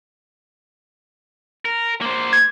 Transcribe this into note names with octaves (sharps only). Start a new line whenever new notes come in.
A#4
A#3 C5
G#6